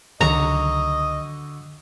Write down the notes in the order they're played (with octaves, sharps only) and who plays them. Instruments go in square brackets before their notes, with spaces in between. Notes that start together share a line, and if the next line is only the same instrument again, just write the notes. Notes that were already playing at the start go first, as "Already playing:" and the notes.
[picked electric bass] C#2 D#3 F#3 [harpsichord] D3 F#4 [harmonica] D#5 [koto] A#5